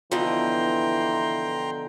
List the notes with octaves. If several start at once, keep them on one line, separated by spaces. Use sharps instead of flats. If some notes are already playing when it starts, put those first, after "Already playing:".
B2 D3 E3 F3 G5 A#5 C6